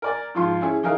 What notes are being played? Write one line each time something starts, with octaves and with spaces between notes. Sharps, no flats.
A#4 D5 G#5
G#2 F3 F4 C6
C#4 E4 G#4
E3 D#4 G#4 A#4 F5